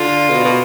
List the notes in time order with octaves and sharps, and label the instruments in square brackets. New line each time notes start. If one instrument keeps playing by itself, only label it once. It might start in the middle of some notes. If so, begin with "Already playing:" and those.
Already playing: [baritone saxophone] D3 [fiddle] F4
[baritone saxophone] B2
B2